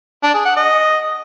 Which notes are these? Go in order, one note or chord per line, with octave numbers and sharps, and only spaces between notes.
D4
G#4
F#5
D#5